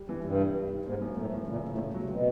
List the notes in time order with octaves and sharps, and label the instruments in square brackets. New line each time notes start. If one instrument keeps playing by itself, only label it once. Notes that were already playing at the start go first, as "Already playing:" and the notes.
Already playing: [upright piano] G3
[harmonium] F#2 [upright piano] E3
[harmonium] G2 [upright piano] C3
[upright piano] C3
G3
D#3
[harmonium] G#2 [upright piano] A#3
[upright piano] F#2
[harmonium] A2 [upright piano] A3
[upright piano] E3
[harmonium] A#2 [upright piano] C#3
[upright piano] C#3
[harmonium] A2
[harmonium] A#2 [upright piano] A3
[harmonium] A#2 [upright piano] F#3
[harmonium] C3
[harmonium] B2 [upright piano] C4